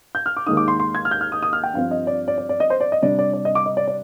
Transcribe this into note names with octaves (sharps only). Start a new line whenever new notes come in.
G6
F6
D6
D#2 D#3 G#3 D#4 D#6
D6
C6
C6
G#6
F6
G6
F6
D#6
D#6
F6
G5
G2 F3 C4 F5
D#5
D5
D5
D5
D5
D#5
C5
D5
D#5
C3 G3 D4 D5
D5
D5
D#5
D6
D#5
D5
D5